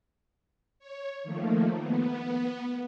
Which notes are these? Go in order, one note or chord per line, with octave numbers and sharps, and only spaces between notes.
C#5
D#3 F3 A3 A#3
B3